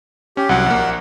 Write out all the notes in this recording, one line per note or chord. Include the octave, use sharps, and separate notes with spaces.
C#4 G4
C2 F#3 F#5
A#1 A#3